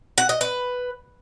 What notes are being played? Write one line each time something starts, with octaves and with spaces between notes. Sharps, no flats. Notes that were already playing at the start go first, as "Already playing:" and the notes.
F#5
D#5
B4